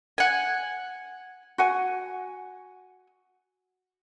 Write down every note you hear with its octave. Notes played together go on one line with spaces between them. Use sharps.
F#5 G#5
F#4 F#5 G#5